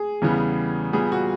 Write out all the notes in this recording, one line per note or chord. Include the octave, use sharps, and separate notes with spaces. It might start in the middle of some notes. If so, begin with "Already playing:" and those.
Already playing: G#4
E2 C#3 E3 G3 B3
A#2 G3 B3 G#4
F#4